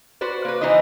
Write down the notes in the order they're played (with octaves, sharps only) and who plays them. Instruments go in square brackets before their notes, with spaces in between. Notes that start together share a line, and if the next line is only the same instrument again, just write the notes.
[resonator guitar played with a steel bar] F#4 B4 C5 D5
A#3 B4
E3 B3 D#4 E4 C5 D#5